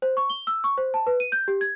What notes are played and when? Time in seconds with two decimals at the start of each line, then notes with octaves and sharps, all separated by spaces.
0.02 C5
0.17 C#6
0.30 G7
0.47 E6
0.64 C#6
0.78 C5
0.94 A5
1.07 B4
1.20 D#7
1.32 G6
1.48 G4
1.61 G#6